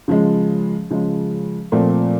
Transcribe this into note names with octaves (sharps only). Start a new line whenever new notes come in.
C#3 F3 G#3
C#3 F3 G#3
A#2 F3 A3 C4